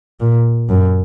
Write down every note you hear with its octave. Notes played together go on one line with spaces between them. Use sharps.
A#2
F#2